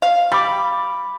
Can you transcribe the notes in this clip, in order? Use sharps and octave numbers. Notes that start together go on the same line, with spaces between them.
F5
G3 B5 D6